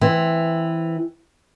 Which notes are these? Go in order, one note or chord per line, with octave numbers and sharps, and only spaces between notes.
E3 C4